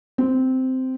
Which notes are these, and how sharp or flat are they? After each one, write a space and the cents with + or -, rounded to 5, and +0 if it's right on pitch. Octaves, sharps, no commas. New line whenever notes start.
C4 -10